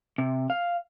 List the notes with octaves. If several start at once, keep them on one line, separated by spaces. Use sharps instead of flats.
C3
F5